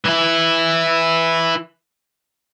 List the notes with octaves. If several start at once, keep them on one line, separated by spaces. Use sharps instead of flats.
E3 E4